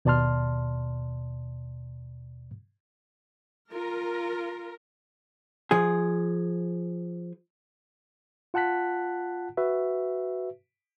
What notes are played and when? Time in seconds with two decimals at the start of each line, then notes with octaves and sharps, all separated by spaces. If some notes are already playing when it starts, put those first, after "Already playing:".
0.05 D#2 B2 D5 A5 C6 F6
3.73 F4 A#4
5.71 F3 G#4
8.54 F4 F#5 A5 F#6 B6
9.57 F#4 B4 E5